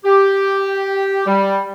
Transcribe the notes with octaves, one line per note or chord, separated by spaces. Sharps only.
G4
G3